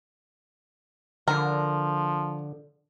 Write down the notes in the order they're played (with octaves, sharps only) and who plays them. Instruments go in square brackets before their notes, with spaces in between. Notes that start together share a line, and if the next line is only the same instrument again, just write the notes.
[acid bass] D3 [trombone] F3 [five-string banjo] A#4